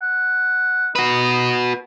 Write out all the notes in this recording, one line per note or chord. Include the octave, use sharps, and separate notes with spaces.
F#5
D#4 F#4 B4